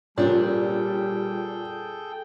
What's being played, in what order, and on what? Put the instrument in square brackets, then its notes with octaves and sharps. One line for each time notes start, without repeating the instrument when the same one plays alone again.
[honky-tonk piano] A#2 [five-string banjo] F3 C#4 D4 [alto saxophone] G3 [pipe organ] G#4 A4 G5